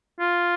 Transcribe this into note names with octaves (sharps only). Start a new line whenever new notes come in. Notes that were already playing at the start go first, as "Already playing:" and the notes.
F4